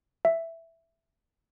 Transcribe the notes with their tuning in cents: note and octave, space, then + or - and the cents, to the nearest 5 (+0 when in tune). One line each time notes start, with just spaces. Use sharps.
E5 +5